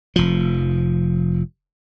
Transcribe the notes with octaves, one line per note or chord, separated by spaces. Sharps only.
F1 F3